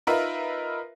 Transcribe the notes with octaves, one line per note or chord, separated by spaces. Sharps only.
D#4 F4 A#4 B4 E5